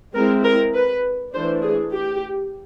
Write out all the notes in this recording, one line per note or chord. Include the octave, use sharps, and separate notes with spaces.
G#3 C4 E4 A#4
A#4
B4
E3 A3 D4 C5
G#4
G4